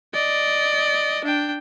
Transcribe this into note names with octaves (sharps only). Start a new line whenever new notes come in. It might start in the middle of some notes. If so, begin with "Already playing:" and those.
D5 D#5
D4 G5